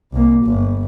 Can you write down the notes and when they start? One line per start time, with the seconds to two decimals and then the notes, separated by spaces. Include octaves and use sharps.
0.13 C2 A#3
0.44 G1